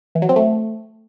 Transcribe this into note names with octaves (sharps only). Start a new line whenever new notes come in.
E3
F#3
C4
A3